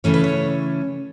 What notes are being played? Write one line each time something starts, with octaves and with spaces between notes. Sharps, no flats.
C#3 E3 A3 C#4 C#5
B4
C#5